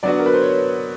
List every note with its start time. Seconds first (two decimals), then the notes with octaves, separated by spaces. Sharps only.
0.03 D3 F#3 B3 D4 F#4 D5
0.19 A#4
0.26 B4
0.34 C5
0.41 C#5